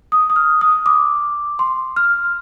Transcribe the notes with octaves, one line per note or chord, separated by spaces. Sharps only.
D#6
D#6
F6
D#6
D6
C6
F6